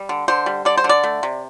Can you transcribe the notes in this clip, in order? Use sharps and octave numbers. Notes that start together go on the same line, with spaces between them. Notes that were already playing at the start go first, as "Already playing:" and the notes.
Already playing: G3
D3
D3 C5
G3
D3 D5
C5
D3
D5
A3
C3